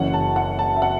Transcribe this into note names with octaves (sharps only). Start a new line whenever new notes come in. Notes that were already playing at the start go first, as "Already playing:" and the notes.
Already playing: F#1 F#2 E3 C#4 F#5
A5
F#5
A5
E5
F#5